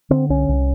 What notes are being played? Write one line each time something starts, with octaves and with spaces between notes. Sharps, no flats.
D3 C4
C2 C#4
C2